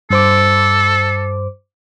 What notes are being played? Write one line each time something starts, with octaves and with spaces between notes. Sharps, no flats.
G2 A4 C5 D6